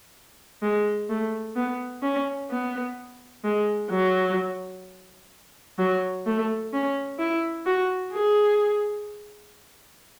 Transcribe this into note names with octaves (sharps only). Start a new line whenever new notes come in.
G#3
A3
B3
C#4
B3
G#3
F#3
F#3
A3
C#4
E4
F#4
G#4